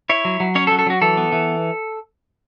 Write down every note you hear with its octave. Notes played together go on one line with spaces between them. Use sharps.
E4 C#5
F#3
F#3
C#4 C#5
A4
F#3
A4
F#3 F#4
E3 A4
B3
E3